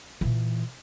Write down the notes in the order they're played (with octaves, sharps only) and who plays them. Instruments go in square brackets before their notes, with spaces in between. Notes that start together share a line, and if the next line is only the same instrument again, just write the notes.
[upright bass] A#2 E3